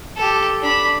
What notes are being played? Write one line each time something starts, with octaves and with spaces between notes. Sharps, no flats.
G4 A4
D4 B5